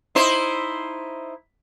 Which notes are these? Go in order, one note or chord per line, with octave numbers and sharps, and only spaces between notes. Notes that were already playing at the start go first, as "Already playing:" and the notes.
D#4 E4 C5